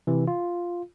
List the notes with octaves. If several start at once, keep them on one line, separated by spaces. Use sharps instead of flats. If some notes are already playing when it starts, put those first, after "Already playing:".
C3 E3
F4